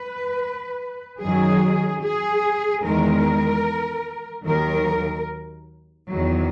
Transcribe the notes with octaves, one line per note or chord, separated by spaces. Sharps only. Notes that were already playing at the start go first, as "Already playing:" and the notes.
Already playing: B4
F#2 D#3 F#3 G#4
G#4
E2 D#3 G#3 A#4
D#2 D#3 F#3 A#4
E2 D#3 F#3